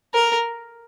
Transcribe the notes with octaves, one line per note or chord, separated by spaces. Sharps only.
A#4